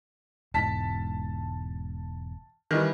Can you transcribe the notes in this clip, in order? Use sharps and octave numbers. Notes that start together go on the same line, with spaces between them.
E1 G#2 A5 B6
D#3 E3 G3